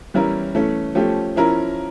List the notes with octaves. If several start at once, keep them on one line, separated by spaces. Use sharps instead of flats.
E3 G3 C#4 E4 A#4
E3 A3 C#4
F3 A3 C#4 G4
F3 C#4 E4 A#4